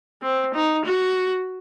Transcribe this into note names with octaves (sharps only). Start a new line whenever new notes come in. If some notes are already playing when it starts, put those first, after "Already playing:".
C4
D#4
F#4